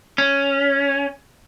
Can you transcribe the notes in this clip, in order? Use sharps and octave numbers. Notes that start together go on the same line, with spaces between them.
C#4